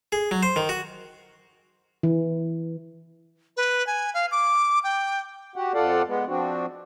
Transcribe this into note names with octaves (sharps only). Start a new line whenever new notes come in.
G#4
F#3
C5
D#3
F#4
E3
B4
G#5
F5
D6
G5
F#4 G4 F#5
F2 F4 A4 D5 F5 F#5
G#3 B3
F3 C4 D4 F#4